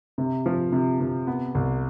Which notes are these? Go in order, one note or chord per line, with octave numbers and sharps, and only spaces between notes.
C3
F3
C3
C3
B3
C2